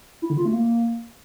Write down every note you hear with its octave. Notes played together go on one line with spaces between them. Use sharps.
E4
D3
F4
A3
A#3